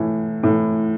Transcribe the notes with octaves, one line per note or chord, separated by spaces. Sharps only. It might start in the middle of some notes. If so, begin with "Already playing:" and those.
Already playing: A2 E3
A2 E3